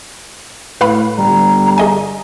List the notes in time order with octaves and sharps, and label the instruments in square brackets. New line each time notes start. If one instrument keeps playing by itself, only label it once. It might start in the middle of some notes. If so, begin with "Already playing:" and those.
[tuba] A2 [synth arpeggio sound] B4 F5 B5
[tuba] G1 [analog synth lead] G3 [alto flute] A#5
[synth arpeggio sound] G#4 D#5 G#5